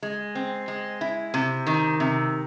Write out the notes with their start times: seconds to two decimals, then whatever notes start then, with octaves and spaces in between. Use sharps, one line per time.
0.02 G#3
0.35 C4
0.68 G#3
1.01 E4
1.34 C3
1.67 D#3
2.00 C3